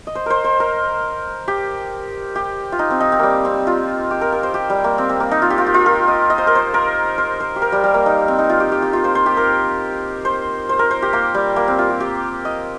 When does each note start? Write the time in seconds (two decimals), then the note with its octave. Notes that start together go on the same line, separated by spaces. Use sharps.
0.07 D#5
0.15 C5
0.26 A#4 C5
0.44 C5
0.60 A#4
1.48 G4
2.35 G4
2.72 F4
2.79 D#4
2.90 C4
3.00 D#4
3.12 C4
3.19 G3 A#3
3.45 C4
3.67 F4
4.11 G4
4.21 A#4
4.32 A#4
4.43 C5
4.54 G4
4.70 G3
4.84 A#3
4.98 C4
5.09 C4
5.20 A#3
5.31 D#4
5.42 F4
5.50 G4
5.58 F4
5.66 G4
5.74 F4
5.86 A#4
6.08 D#5
6.30 D#5
6.38 C5
6.47 A#4
6.55 C5
6.74 A#4
7.18 C5
7.40 C5
7.56 G4
7.62 A#4
7.72 G3
7.84 G3
7.94 A#3
8.06 D#4
8.28 C4
8.39 D#4
8.50 F4
8.60 G4
8.72 G4
8.82 G4
8.93 F4
9.04 C5
9.15 C5
9.26 G4
9.37 A#4
10.25 C5
10.69 C5
10.79 A#4
10.91 C5
11.02 G4
11.13 A#3
11.35 G3
11.56 A#3
11.68 C4
11.79 F4
11.90 G4
12.00 G4
12.45 D#5